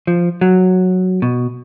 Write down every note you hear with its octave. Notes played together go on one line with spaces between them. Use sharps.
F3
F#3
B2